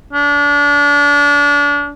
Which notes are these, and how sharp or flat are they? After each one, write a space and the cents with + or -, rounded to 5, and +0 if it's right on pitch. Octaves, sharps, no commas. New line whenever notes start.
D4 -30